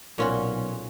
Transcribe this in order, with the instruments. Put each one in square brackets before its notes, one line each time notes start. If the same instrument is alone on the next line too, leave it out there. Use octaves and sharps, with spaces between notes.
[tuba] B1 [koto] A#2 C#4 F#4 [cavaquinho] C6 C#6